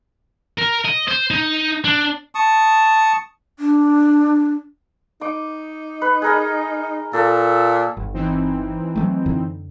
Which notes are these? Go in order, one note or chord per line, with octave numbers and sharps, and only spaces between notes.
A#4
D#5
C5
D#4
D4
A5 C#6 D#6
D4
D#4 D6
B4
G#4 A#4 D#5
A#2 A4
G1
E3 C4 D#4
F#3 G#3 A3
F#2 D3